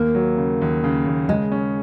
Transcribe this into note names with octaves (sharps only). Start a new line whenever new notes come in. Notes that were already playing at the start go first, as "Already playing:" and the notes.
Already playing: D#2 A#3
F#3
C#3
D#2
C#3
D#2
C#3 G#3
C#4